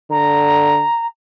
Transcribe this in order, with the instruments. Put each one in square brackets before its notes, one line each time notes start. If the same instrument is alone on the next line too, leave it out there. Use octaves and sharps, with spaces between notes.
[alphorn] D3 [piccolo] A#5